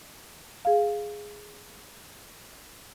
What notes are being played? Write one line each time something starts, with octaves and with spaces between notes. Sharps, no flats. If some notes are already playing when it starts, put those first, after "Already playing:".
G#4 F5